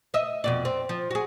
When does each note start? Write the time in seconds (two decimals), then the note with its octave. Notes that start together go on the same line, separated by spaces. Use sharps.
0.14 D#5 E5
0.44 F2 B2 D5
0.65 C4
0.89 F3
1.11 F#4 G#4